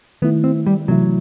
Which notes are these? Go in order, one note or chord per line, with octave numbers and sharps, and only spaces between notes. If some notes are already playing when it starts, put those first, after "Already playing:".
D#3 A3 B3 E4
C4
G3
C3 E3 F#3 A3 E4